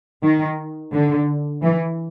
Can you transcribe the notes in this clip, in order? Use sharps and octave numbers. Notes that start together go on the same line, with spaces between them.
D#3
D3
E3